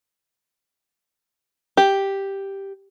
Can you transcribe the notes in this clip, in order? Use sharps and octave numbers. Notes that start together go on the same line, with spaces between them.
G4